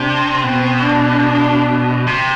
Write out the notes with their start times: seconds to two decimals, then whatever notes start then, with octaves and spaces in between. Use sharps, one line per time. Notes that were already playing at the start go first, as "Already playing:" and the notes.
Already playing: C3 D4
0.43 B2 C4
0.83 D4
2.07 C3